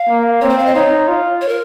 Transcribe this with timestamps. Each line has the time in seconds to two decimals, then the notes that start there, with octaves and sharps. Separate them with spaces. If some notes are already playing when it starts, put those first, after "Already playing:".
Already playing: F5
0.09 A#3
0.41 C4 C#5
0.50 C5
0.59 F5
0.66 D#5
0.75 D#4 C#5
1.08 F4
1.41 C#5
1.49 A#4